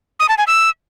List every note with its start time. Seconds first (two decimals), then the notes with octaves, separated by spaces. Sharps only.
0.20 D#6
0.29 A5
0.38 G#5
0.47 E6